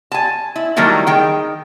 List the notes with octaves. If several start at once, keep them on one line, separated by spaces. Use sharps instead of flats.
G#5 A5
E4
D#3 F#3 G3 A3 A#3 E4
D#3 G#4 G5